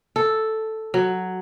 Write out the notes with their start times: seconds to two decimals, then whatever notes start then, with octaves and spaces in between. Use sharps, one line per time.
0.16 A4
0.94 F#3